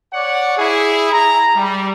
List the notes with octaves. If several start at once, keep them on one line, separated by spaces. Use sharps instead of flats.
C#5 D5 F#5
E4 G#4
A#5
G3